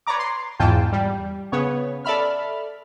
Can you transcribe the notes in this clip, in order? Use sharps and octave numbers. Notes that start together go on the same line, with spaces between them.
B4 C#5 D5 A#5 D6
C6
E2 G#2 E3 F4 G5 A5
G3
C#3 B3 C#5
A4 D5 E5 B5 F6